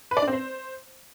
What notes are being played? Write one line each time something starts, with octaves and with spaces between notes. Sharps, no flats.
B4
D5
D4
C4
C5